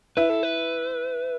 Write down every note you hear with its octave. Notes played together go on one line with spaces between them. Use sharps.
E4 B4
A4
B4